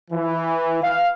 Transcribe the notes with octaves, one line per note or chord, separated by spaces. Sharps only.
E3
F5